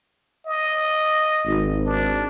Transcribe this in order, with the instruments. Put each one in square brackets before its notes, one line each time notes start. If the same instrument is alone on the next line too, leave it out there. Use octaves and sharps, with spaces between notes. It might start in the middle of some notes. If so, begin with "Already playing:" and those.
[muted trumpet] D#5
[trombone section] G#1
[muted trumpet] D4